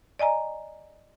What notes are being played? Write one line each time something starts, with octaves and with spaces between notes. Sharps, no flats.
D5 D#5 G#5 A#5